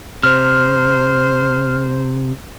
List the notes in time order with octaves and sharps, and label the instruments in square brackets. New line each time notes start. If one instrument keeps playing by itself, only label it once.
[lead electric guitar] C3 [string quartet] C5 [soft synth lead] F6